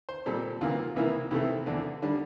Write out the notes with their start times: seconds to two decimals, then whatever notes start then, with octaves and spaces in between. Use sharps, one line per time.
0.09 C5
0.26 A#2 G3 C4 A4
0.61 D2 C3 E3 A#3 F4
0.96 C2 C3 E3 A#3 E4
1.31 C2 C3 E3 A3 C4 E4
1.66 E2 D3 A3 D4
2.02 D3 G3 D4